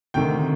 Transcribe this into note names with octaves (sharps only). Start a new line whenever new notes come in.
D2 C3 D#3 G5